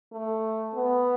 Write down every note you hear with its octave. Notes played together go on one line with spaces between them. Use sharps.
A3
B3